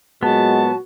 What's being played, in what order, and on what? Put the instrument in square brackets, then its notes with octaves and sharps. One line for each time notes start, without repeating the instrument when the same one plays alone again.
[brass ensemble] A#2 F#3 G#3 [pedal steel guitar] B3 [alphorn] F#4 [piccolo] A5